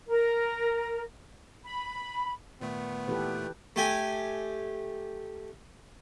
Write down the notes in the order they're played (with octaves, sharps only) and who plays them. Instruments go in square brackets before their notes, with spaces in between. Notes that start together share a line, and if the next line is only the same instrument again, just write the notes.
[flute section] A#4
B5
[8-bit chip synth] A#2 D#3 A3 [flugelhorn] B3
[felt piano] D#2 E3 [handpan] G4 A4 B4
[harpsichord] A3 G4 G#5